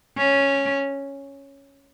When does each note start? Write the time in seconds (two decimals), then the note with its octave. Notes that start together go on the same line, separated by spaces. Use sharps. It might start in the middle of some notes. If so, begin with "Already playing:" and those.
0.17 C#4